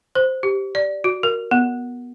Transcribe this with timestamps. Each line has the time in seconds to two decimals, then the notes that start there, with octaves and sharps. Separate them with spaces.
0.15 C5
0.43 G4
0.75 D5
1.04 F#4
1.23 A#4
1.51 B3